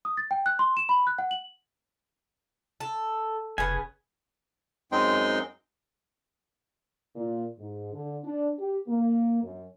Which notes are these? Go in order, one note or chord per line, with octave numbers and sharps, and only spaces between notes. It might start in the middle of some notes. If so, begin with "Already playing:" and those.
D#6
A6
G5
F#6
C6
E7
B5
F#6
F#5
F#7
A4
F1 C#3 B3 G#5
F#2 G#3 C4 D#4 G5 C6
A#2
G#2
D3
D4
G4
A#3
F#2